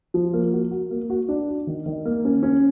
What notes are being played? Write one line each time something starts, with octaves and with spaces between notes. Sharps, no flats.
F3
A#3
F#4
F#4
A#3
F#4
D4
F#4
D#3
D#3
A#3
C#4
C#4